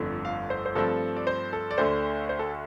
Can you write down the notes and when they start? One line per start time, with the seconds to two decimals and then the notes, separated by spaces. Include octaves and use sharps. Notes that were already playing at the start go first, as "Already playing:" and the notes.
Already playing: G1 F2 D3 A3
0.25 F5
0.50 C5
0.66 C5
0.75 G2 F3 A3 C4 A4
1.16 D5
1.27 C5
1.53 A4
1.71 D5
1.78 D2 D3 A3 C5
2.29 C5
2.39 A4